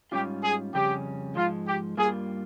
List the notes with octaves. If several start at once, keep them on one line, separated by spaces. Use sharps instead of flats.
G#2 G3 C#4 F4 G4
G#4
F2 C#3 G3 C#4 G4
G#2 F3 G#3 F4
G4
G2 G3 A#3 F4 G#4